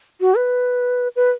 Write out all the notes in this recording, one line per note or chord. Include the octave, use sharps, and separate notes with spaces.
F#4
B4
B4